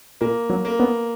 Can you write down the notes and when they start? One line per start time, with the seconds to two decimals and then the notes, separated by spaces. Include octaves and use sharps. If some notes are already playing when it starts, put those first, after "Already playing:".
0.21 A#2 A#3
0.50 F#3
0.65 A#3
0.80 B3